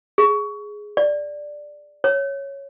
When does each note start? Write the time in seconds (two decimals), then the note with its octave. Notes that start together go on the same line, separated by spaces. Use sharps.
0.18 G#4
0.97 D5
2.04 C#5